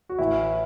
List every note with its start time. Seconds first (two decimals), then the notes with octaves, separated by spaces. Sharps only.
0.09 F#4
0.18 A1 A2 E3 E4